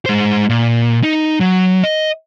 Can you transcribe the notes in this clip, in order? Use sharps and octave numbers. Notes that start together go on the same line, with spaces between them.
G#3 C5
A#2
D#4
F#3
D#5